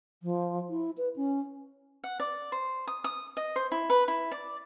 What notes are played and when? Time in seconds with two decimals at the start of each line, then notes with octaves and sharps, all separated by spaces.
0.23 F3
0.69 E4
0.98 B4
1.16 C#4
2.04 F#5
2.20 D5
2.52 C5
2.87 D#6
3.04 D#6
3.37 D#5
3.56 C5
3.72 E4
3.90 B4
4.08 E4
4.32 D5